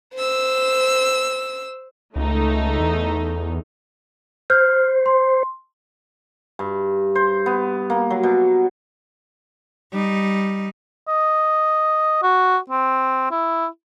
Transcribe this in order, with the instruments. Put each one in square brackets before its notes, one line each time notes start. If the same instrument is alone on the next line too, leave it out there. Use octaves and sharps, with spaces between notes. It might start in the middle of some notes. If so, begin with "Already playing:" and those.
[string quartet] C5 E6
[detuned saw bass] C#2 [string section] A3 D#4
[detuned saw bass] E2
[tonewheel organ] C5 [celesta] F6
[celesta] C6
[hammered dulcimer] G2
C5
B3
A#3
F#3
B2
[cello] G3 D#4
[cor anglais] D#5
F#4
C4
E4